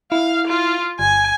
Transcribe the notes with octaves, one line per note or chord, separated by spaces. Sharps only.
E4 F5
F4
G1 G#5